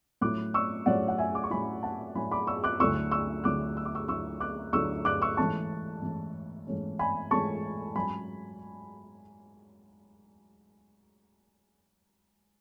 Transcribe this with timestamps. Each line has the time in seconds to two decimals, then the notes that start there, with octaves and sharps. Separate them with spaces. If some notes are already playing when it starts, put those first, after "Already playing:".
0.21 A2 F#3 C#4 E4 D6 F#6
0.54 C#6 E6
0.86 A2 F#3 C#4 E4 D5 F#5
1.08 F#5
1.18 E5 G#5
1.35 D6
1.44 C#6
1.50 A2 F#3 C#4 E4 G#5 B5
1.83 F#5 A5
2.15 A2 F#3 C#4 E4 G#5 B5
2.31 B5 D6
2.47 C#6 E6
2.64 D6 F#6
2.80 D2 D3 F#3 A3 E4 C#6 E6
3.11 C#6 E6
3.44 D2 D3 F#3 A3 E4 D6 F#6
3.77 E6
3.85 D6
3.95 C#6 E6
4.08 D2 D3 F#3 A3 E4 C#6 E6
4.40 D6 F#6
4.73 D2 D3 F#3 A3 E4 C#6 E6
5.05 D6 F#6
5.22 C#6 E6
5.37 G#2 E3 A3 C#4 A5 C#6
6.02 G#2 E3 A3 C#4
6.67 G#2 E3 A3 C#4
6.99 G#5 B5
7.31 G#2 E3 A3 C#4 A5 C#6
7.95 G#2 F#3 C#4 G#5 B5